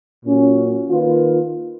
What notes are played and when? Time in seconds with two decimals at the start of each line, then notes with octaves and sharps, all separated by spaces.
0.23 A#2 F#3 C#4
0.88 D#3 A#3 F4 B4